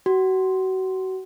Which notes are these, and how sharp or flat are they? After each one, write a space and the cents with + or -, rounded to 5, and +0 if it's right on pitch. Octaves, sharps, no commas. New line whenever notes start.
F#4 +30